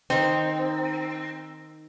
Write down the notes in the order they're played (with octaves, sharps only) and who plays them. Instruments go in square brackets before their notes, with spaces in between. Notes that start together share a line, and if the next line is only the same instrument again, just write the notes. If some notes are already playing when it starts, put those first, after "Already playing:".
[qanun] D#3 D#4 [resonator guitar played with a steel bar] C4